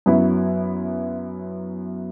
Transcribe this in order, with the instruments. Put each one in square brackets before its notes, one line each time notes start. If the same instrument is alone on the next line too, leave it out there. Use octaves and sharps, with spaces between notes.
[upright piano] F#2 F#3 B3 E4